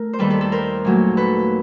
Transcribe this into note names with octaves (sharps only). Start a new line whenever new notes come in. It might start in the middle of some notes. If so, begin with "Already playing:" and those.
Already playing: A3 A#4
C5
D#2 D#3 G3 A4 B4
A4 B4
A4 B4
A#4 C5
A#2 F#3 A3
A4 B4